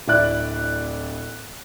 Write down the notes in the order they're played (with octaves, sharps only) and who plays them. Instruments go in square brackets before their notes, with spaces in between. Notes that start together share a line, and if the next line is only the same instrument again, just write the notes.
[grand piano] D1 E4 D5 F#6